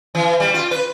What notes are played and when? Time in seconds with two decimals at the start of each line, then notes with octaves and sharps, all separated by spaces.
0.15 E3
0.40 G3
0.54 F4
0.71 B4